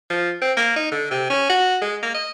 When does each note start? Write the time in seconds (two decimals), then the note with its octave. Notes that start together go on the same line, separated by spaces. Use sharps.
0.10 F3
0.41 C4
0.57 A#3
0.76 D#4
0.92 D3
1.11 C3
1.30 C#4
1.49 F#4
1.82 G#3
2.03 A#3
2.14 D#5